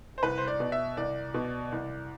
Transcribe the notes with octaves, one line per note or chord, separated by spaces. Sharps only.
C5
C2 B4
C5
D5
B2
E5
C2 D5
B2
C2